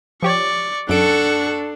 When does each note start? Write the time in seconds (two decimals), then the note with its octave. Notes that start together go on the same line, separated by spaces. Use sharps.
0.23 F3 G4 C#5 D5 C#6
0.89 F#2 D4 A4 F#5 C#6 D7